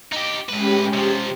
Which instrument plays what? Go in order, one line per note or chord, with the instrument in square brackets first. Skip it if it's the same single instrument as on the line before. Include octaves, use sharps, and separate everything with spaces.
[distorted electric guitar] D#4 G4
[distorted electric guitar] A2 B4 [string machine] G#3 C#4 G4
[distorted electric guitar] C3 F3